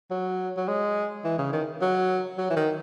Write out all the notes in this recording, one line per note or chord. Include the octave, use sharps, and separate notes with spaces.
F#3
F#3
G#3
E3
C#3
D#3
F#3
F#3
E3
D#3